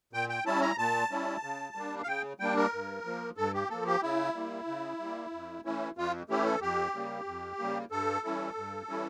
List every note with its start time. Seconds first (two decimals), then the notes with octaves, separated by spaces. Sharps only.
0.13 A#2 G5
0.29 G5
0.46 G3 C#4 E4 A5
0.62 A#5
0.78 A#2 A5
1.11 G3 C#4 E4
1.43 C#3
1.75 G3 A#3 D4
2.03 F5
2.07 C#3 G5
2.40 G3 A#3 D4 G5
2.57 A#4
2.73 G2
3.05 F3 A#3
3.37 G2 A4
3.54 G4
3.70 F3 A#3 A4
3.87 G4
4.02 C#3 E4
4.35 G3 A#3
4.67 C#3
5.00 G3 A#3
5.33 F2
5.65 E3 A3 C#4 E4
5.97 F2 F4
6.29 E3 A3 C#4 E4 G4
6.45 A4
6.61 F2 G4
6.94 C#3 G3 A#3
7.26 F2
7.59 C#3 G3 A#3
7.91 G2 A4
8.24 E3 G3 C#4 E4
8.56 G2
8.89 E3 G3 C#4 E4